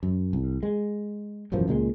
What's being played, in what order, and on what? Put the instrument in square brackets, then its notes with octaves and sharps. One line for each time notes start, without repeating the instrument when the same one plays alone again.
[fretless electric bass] F#2
C2
G#3
E1 A1 F#2 F3
C#2 A#2 G3 G#3